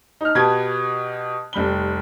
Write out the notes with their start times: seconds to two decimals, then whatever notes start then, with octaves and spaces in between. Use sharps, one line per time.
0.21 D#4 F6
0.35 B2 G4 B4 A5 G#6
1.53 F1 G3 B5 G7